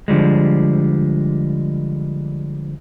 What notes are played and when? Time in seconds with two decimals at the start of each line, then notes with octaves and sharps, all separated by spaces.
0.08 D3 F3 G3 G#3